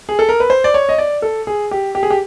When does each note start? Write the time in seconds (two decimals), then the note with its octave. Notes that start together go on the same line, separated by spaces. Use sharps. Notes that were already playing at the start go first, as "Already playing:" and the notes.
0.09 G#4
0.19 A4
0.29 A#4
0.40 B4
0.50 C5
0.64 D5
0.74 C#5
0.89 D#5
0.98 D5
1.22 A4
1.47 G#4
1.71 G4
1.95 G4
2.03 G#4
2.10 G4